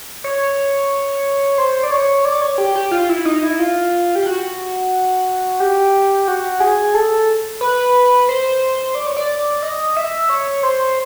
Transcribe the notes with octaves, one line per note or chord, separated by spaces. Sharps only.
C#5
C5
D5
C#5
D5
C#5
G4
G4
F4
E4
D#4
E4
F4
G4
F#4
G4
F#4
G#4
A4
B4
C5
D5
C#5
D5
D#5
E5
C#5
C5